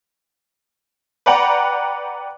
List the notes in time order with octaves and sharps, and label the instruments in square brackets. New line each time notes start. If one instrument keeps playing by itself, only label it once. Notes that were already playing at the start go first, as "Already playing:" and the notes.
[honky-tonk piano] B4 D5 F#5 G5 A#5